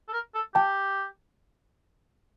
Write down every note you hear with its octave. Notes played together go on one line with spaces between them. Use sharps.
A4
A#4
A4
G4 G5 A5